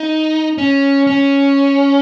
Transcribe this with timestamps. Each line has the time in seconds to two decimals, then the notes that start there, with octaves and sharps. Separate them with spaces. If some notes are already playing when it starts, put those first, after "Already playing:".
Already playing: D#4
0.58 C#4
1.07 C#4